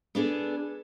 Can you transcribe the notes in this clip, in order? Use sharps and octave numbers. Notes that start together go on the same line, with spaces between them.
B3 D4 G#4 A4